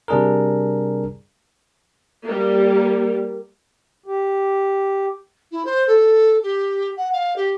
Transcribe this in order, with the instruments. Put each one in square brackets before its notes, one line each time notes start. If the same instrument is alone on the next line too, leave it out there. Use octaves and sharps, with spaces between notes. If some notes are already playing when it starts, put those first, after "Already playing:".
[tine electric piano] C3 G3 D4 G#4 A#4
[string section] G3 A#3
[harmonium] G4
[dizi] E4
C5
A4
G4
F#5
F5
G4